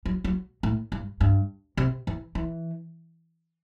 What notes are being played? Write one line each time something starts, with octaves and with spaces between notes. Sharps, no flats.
F#3
F#3
A2
G2
G2
C3
E3
E3